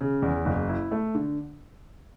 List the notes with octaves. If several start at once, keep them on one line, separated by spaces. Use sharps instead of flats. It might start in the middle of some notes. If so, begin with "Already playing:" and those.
C#3
E2
F#1
E4
A3
D3